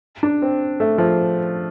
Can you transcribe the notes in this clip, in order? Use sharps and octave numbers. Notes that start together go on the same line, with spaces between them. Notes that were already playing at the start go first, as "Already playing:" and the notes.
D4
C4
A3
F3